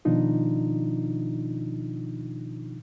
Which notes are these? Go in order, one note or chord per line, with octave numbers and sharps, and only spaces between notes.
B2 D#3 F3 D4 D#4 F4